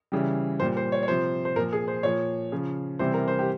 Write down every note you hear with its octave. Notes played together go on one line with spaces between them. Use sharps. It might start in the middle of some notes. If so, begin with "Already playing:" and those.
C#3 E3 G3
A#2 G3 C5
C5
C#5
C#5
C3 F3 C5
C5
A#2 F3 A#4
G#4
C5
A#2 F3 C#5
C#3 F3
C3 E3 G3 C5
A#4
C5
G4